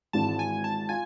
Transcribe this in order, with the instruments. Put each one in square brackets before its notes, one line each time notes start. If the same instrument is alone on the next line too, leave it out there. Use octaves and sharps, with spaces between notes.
[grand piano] G#1 G#2 E3 [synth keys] A5
[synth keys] G#5
A5
[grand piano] F4 [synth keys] G#5